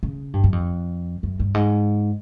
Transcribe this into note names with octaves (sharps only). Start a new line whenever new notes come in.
C#3
G2
F#2
F2
F#2
G2
G#2